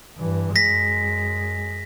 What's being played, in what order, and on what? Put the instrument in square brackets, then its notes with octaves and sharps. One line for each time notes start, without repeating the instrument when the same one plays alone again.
[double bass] G2 E3
[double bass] F#2 G#3 [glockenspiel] A#6 B6